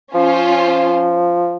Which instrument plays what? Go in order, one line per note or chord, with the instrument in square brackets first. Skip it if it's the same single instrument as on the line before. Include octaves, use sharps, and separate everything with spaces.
[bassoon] F3 [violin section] C#4 F4 C5